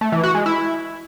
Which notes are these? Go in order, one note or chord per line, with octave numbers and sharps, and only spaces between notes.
A3
E3
F#4
G#3
E4